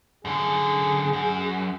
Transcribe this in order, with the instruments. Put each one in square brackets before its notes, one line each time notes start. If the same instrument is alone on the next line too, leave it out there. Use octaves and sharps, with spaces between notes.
[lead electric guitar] F#2 D3 [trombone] G#4
[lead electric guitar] F#2